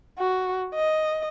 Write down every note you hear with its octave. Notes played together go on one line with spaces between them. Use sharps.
F#4
D#5